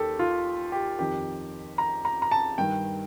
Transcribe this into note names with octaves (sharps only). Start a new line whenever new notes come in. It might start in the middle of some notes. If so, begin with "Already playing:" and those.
Already playing: D#2 D#3 G4 A4
F4
G4
F2 D#3 G4
A#5
A#5
A#5
A5
G2 D#3 G5